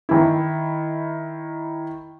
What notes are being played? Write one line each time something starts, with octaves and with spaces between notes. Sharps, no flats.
D#3 E4